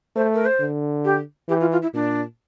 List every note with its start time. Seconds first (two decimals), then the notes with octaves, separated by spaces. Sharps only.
0.15 A3 C5
0.34 A#4
0.45 C5
0.60 D3
1.04 G4
1.48 E3 G4
1.60 F4
1.71 F4
1.82 E4
1.94 A#2 D4